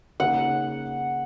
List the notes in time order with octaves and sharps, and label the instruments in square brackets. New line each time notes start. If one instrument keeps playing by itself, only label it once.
[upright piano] C#3 A#3 D#4 G#4 [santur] F#5